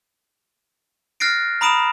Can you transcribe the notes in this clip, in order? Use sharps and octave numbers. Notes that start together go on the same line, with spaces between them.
F6 F#6 A6 A#6 C7 D7
A#5 B5 D#6 D7 E7 F7